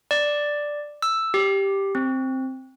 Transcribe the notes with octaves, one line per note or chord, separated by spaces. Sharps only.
D5
E6
G4
C4